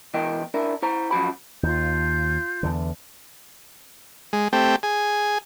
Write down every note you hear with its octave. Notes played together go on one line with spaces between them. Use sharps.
B2 E3 E4 A#4 D#5 G5
D4 E4 A#4
E4 C5 A#5
F#2 F3 F#4 B5
D#2 F4 G6
E2 D3
G#3
A3 C4 G4
G#4